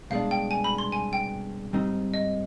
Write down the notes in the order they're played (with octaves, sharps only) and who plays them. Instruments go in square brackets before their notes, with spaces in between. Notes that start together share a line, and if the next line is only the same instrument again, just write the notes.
[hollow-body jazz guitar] C2 B2 G#3 D4 [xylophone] F5
[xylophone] G5
G#5
B5
C6
G#5
G5
[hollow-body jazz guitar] G#2 G3 C4 D#4
[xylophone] D#5